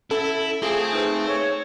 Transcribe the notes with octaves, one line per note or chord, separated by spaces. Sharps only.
C#4 E4 A4 E5
A3 C4 F4 G#4 A4 F5
D#4 B4 C5
C#5